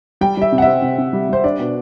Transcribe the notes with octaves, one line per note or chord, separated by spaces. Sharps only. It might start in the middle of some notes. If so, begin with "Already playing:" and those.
G3 G5
G3 E5
C3
F#5
C4 E5
C3
C3
G3
G3 C5
D4 D5
B2